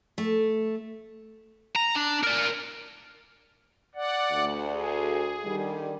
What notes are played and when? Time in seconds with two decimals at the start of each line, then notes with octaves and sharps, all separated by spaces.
0.18 A3
1.76 A#5
1.96 D4
2.24 A#4 D5
3.95 D5 F#5
4.32 D2
4.71 G#4
5.45 D3 D#3 G3